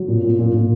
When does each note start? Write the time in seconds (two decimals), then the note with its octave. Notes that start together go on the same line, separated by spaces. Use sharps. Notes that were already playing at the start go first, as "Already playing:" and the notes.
Already playing: F#3
0.08 A#2
0.22 A#2
0.39 A#2
0.54 A#2